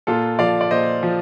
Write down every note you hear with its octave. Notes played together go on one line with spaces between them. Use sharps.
A#2 F4 A4
F3 D5 F5
D5
A#2 C5 D#5
F3